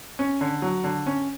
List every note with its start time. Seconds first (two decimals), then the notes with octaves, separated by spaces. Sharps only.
0.19 C#4
0.41 D3
0.62 F#3
0.84 D3
1.06 C#4